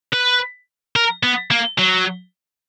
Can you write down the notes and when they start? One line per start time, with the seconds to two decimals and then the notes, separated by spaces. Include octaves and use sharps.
0.13 B4
0.96 A#4
1.23 B3
1.51 A#3
1.79 F#3